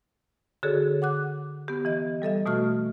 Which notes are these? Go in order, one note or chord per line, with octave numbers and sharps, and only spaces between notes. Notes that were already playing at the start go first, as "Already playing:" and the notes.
D3 F#4 G#4 A4 C#5
F#5 D6 F#6
B3 G4
E3 D#5
G3 A4 D#5 E5
B2 E3 A3 F#4 C#6 F6